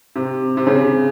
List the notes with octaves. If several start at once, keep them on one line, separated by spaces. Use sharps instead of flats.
C3
C3
C#3